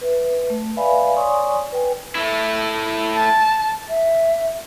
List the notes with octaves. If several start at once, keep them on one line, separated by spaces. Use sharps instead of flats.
B4 E5
A3
B4 D5 E5 F5 G#5 B5
C#5 D5 G#5 C6 C#6 D#6
B4 G5 G#5
A3 E4
A5
E5